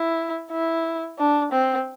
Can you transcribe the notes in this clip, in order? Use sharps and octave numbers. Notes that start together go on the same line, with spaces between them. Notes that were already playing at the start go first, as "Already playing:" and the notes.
Already playing: E4
E4
D4
C4